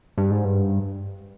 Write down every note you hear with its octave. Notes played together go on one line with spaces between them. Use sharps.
G2
G#2
G2